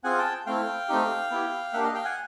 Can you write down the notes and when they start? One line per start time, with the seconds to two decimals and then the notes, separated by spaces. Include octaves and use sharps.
0.04 C4 F4 G#4 F#5 G#5
0.19 G5 A5
0.46 A3 C4 E4 F5 G5
0.88 A3 C4 D#4 G4
1.31 B3 E4 G4
1.73 A#3 D4 G4 E5 F#5
1.84 D#5 F5
1.94 F5 G5
2.05 F#5 G#5